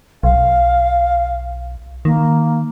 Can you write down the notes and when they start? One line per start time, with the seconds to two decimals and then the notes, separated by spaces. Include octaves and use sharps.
0.23 B1 F5
2.05 D#3 A#3